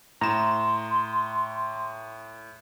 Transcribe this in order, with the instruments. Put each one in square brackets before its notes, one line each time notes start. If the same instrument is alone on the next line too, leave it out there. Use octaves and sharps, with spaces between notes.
[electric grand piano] A2 E7 [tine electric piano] A#5 [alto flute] C6